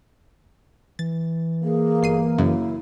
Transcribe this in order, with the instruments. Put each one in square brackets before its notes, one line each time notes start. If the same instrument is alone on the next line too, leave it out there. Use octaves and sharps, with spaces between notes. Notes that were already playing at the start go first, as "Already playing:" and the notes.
[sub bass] E3 [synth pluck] A6
[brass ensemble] A#3 [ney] G#4
[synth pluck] G1 C7 D#7
[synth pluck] F#2 C#3 [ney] E4